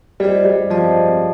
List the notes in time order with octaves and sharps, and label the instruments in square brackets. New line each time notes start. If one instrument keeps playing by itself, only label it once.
[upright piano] G3 [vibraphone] F4 G#4 C5 D#5
[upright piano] G3
[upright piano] F3 [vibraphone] F4 G#4 C5 D#5